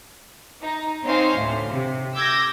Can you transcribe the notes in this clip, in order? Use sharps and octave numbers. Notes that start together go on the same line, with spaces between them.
D#4
C4 D#4 C5 C#5 F5 G#5
D2 A2
C3
D6 E6 G6 G#6 A#6